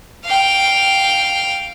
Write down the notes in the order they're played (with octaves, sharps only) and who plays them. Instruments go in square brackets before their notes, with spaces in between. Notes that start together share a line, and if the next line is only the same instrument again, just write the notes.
[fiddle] F5 G5